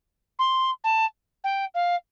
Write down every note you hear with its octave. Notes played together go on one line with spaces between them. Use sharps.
C6
A5
G5
F5